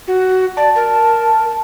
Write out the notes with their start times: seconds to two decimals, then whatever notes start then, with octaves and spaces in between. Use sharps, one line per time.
0.07 F#4
0.57 D5 A5
0.75 A#4